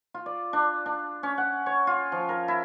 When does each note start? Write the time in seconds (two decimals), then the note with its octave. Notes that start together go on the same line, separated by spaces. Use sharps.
0.14 F4
0.26 D5
0.53 D4
0.86 D4
1.23 C#4
1.38 F#5
1.66 C#5
1.87 F4
2.12 F3
2.29 A#4
2.48 E4